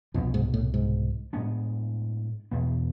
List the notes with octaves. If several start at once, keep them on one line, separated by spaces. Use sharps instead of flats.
C2 F2 B2 B3 D4
G#2
A2
G#2
A2 G#3 B3 D4
E2 B2 B3